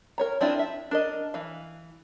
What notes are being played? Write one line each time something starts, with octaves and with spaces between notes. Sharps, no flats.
A#4 C#5 A#5
C4 D4 E4 F4 G#4
E5
D4 A#4 D#5
E3 F5